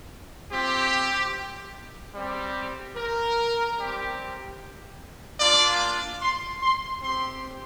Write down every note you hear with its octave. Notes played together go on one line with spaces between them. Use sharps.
C4 F4 G4
G3 C4 G4
A#4
G3 C4 G4
A#3 D4 F4 D5
C6
C6
C4 G4 C6